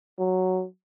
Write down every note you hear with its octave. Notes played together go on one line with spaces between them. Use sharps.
F#3